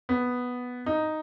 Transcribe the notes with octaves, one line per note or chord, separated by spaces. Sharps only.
B3
D#4